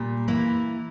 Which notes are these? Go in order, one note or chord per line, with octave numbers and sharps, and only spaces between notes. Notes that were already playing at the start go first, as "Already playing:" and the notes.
Already playing: A#2 G3
E3 A#3 E4